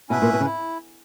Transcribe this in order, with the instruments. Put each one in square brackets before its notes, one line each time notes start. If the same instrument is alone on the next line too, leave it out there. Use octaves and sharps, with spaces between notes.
[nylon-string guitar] B2 [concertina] C#4 E4 B4 E5
[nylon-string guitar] A#2
B2
C#3
[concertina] E4